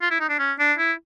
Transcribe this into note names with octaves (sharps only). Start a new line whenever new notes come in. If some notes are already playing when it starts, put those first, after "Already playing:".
F4
E4
D#4
D4
C#4
D4
E4